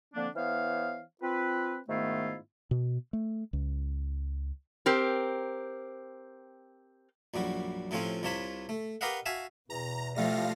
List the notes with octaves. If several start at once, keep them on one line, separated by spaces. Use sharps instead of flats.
D3 F3 A#3 C4 D4
E3 B3 C5 C#5 F5
C4 F4 B4
G#2 D#3 A3 B3 E4 F4
B2
A3
C#2
C4 G4 A#4
A#1 F#2 G3 F#4
A2 C3 F3 C4 C#4 F4
C2 C3 F4 C#5 A5 B5
A3
G4 A#4 B4 D#5 F5 F#5
F#4 E5 F5 G#5 A5
E2 B2 A#5
F3 G3 A3 E4 G4 F5 A#6